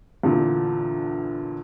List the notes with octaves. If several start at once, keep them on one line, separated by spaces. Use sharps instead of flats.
E2 A#2 D3